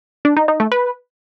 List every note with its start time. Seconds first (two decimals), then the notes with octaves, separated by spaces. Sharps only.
0.25 D4
0.37 D#4
0.48 D#4
0.60 A3
0.72 B4